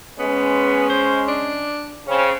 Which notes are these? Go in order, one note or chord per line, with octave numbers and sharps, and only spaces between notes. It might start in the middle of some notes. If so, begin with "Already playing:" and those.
G#3 B3 C#4
C5
D4
C#3 C4 C#4